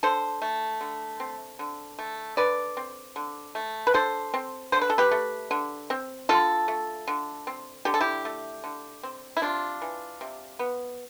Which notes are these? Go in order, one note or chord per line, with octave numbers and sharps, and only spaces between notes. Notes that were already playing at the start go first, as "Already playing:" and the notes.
D3 A4 C5
A3
D3
C4
D3
A3
D3 B4 D5
C4
D3
A3
B4
D3 A4 C5
C4
D3 C5
B4
A4
G4 B4
A3
D3
C4
D3 F4 A4
A3
D3
C4
D3 G4
A4
E4 G4
A3
D3
C4
E4
C3 D4 F4
E3
C3
B3